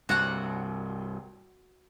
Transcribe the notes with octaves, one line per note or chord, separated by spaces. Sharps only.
C2 G2 F#4 F#5